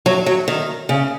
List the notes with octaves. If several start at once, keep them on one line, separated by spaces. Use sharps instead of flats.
F#3
F#3
D#3
C#3